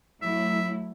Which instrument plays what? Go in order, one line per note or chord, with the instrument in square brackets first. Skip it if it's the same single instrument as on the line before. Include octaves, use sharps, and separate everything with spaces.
[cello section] F#3 A3 E4 [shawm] E5